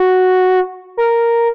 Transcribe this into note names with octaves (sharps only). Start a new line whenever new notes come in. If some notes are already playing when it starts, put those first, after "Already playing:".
Already playing: F#4
A#4